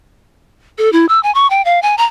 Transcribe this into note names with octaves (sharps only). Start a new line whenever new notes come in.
A4
E4
E6
G#5
C#6
G5
F5
G#5
A#5